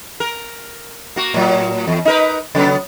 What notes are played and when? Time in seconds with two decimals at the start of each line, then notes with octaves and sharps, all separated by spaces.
0.20 A#4
1.16 A#3 F#4
1.34 A2 F#3
1.88 E2
2.05 D#4 A#4 B4
2.55 C#3 F#3 B3